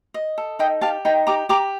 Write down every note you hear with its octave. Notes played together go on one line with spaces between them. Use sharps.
D#5
A4
D#4 D#5 G5
G4 F5 A5
D#4 G5 A#5
G4 A#5 D6
G4 A#5 D6